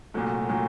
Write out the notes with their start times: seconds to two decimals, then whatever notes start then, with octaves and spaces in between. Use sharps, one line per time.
0.14 C2 A#2 F#3 A3
0.49 A#2 F#3 A3